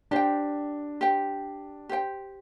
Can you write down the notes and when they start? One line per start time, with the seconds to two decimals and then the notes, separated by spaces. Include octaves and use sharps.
0.11 D4 G4 C5 G5
1.01 G4 C5 G5
1.89 G4 C5 G5